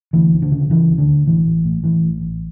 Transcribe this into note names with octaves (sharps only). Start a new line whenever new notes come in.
D2 E3
D2
D3
C#3
C#3 E3
D2
D3
D2
A1 E3
A1
A2
A2 E3
A1
A1